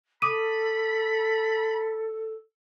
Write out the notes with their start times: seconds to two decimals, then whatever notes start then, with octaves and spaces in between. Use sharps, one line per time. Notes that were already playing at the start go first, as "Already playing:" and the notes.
0.22 A4 B5 D6 D#6 D#7